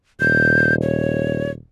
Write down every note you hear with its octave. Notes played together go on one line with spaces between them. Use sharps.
D#1 G6
C#5